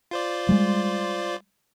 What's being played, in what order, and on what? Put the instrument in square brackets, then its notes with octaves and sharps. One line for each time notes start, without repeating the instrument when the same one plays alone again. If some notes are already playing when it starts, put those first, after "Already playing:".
[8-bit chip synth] F4 C5 D5
[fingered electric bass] G3 G#3